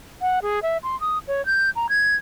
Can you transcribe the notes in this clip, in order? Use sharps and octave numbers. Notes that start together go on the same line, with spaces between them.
F#5
G#4
E5
C6
D#6
C#5
G6
A#5
G#6